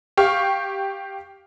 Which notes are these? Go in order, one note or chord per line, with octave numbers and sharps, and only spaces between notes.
G4 F5 C#6